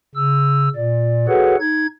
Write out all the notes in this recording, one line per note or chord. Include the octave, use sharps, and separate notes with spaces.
C#3 E6
A#2 D5
F#4 G#4 A4 B4 C#5 F#5
D#4 G#6